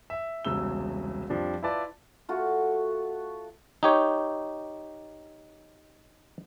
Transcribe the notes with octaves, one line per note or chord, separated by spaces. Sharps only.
E5
E1 C2 C#3 E6 G7
F2 F3 G3 D4
E4 F4 B4 D5 A5
A3 F4 F#4
D#4 G4 C#5